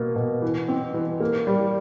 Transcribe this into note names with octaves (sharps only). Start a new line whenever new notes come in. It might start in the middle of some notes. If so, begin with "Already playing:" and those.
Already playing: B2 A#3
B2
E3
C4
E3
A#3
G3